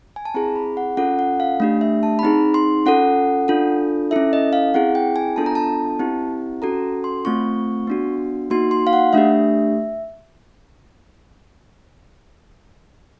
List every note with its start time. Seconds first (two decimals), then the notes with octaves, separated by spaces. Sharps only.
0.16 G#5
0.25 A5
0.34 C4 E4 G#4 A#5
0.56 B5
0.77 F#5
0.97 C#4 F4 A4 F#5
1.19 F#5
1.40 F5
1.60 A3 D4 G4
1.81 E5
2.03 A5
2.19 B5
2.23 C4 D#4 G#4 A#5
2.54 C6
2.86 C#4 F4 A4 F#5
3.48 D4 F4 A4
4.11 C#4 E4 A4 E5
4.33 D#5
4.53 F5
4.74 C4 E4 G#4 F#5
4.95 G5
5.16 G#5
5.36 B3 D4 F4 A4 A5
5.46 A#5
5.55 A5
5.99 C4 E4 G4
6.62 C#4 F#4 A4 A#5
7.04 C6
7.25 A3 C4 F4 C#6
7.87 B3 D4 F#4
8.50 A#3 D#4 F#4 C6
8.71 C6
8.87 F5
8.93 F#5
9.13 A3 D4 G4 E5